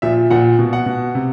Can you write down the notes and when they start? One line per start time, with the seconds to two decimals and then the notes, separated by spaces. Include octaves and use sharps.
0.02 A#2 F3 E5
0.30 A#2 F3 F#5
0.59 B2
0.73 F#5
0.86 B2
1.15 C3